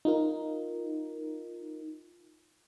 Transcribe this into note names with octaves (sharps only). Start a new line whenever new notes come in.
D#4 F4 A#4